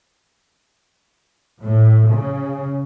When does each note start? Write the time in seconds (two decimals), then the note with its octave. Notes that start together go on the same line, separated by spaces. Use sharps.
1.62 A2
2.10 C#3